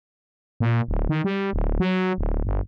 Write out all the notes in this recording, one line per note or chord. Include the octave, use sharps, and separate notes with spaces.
A#2
D1
D#3
G3
D1
F#3
D1
G1